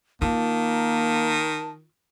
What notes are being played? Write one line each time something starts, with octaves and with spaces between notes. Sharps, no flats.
D#3 A#3 F4 A5